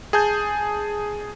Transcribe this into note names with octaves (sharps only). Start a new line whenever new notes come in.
G#4 G#5 A5 G6